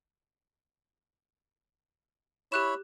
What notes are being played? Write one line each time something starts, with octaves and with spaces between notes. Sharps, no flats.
E4 G4 C#5 B5 F#6 E7